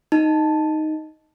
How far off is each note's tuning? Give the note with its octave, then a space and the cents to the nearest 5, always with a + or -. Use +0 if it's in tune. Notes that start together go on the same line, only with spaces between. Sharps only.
D#4 +0 A5 +0